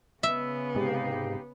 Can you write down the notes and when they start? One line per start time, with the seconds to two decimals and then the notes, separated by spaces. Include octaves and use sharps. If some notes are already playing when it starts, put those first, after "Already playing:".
0.23 C#3 B3 E5
0.75 G#2 C3 D#4 G4 F5